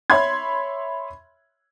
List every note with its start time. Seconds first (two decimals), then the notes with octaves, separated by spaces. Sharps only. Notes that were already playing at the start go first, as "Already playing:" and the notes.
0.10 C#5 E5 B5 C6 G#6